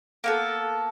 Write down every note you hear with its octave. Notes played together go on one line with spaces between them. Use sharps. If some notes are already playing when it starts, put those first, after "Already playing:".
A#3 B3 A4